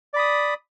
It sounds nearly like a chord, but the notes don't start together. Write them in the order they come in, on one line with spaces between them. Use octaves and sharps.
D5 B5 D#6